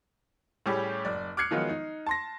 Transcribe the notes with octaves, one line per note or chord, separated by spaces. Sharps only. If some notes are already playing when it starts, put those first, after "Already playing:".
A2 G3 C#4 G4 G#4
F#1 D5
D6 F6 F#6 G#6 C7 C#7
D#3 F3 F#3 G#3 B3 F4
D#4
A5 C6 A#6